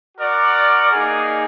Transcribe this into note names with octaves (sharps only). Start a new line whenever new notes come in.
F#4 A#4 D5 F#5
A#3 D#4 G#4